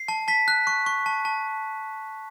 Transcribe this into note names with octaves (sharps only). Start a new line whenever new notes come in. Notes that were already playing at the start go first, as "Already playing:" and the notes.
Already playing: C7
A5
A5 B6
F#6
C#6
C#6
A5
A5